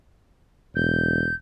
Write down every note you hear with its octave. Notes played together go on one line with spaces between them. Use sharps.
E1 G6